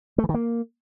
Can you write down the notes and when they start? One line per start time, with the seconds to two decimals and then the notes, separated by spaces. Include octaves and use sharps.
0.18 A3
0.24 E3
0.29 D#3
0.34 A#3